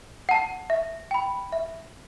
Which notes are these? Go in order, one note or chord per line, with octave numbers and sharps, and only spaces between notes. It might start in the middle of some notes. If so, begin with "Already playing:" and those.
F#5 A5
E5
G5 B5
E5